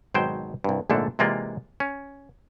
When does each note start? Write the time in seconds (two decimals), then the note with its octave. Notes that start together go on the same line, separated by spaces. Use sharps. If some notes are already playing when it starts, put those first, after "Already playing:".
0.14 G#1 B2 F#3 C5 G5
0.64 C2 G2
0.90 A#1 G#2 D3 A3 D4 A4
1.19 C3 E3 G#3 A#3 F4 D5
1.80 C#4